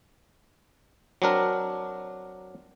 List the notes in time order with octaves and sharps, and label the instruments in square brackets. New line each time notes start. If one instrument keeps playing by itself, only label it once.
[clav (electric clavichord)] F#3 C4 D4 A#4